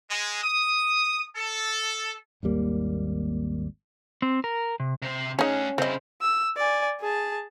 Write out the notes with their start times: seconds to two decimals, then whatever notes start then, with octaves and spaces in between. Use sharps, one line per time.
0.10 G#3
0.42 D#6
1.36 A4
2.43 G#1 D#2 G3 A#3
4.22 C4
4.44 A#4
4.80 C3
5.02 C3 C5
5.39 A3 C#4 D#4 G#4 F#5
5.78 C#3 C4 E4 C5 D#5
6.21 E6
6.57 D5 G#5
7.01 G#4 A5